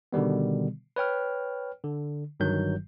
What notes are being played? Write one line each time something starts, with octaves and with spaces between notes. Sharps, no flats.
B2 D3 D#3 G3 B3
B4 C#5 G5 F6
D3
G1 G2 D#3 F#3 G6